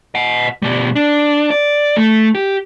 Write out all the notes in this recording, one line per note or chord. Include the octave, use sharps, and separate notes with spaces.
D#5 F#5
B2 G3
D4
D5
A3
G4